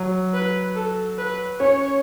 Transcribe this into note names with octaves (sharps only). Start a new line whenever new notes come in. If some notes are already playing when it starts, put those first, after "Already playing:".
Already playing: F#3
B4
A4
B4
C#4 C#5